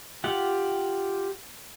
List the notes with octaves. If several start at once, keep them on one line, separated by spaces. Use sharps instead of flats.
F4 G4 F#5